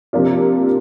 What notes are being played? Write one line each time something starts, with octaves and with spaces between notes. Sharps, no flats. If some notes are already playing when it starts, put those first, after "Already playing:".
C3 F3 A#3 D4 F4